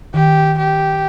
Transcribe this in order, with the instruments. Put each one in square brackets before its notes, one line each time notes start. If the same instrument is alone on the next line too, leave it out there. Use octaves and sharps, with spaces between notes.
[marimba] D#3 [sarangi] G4
[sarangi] G4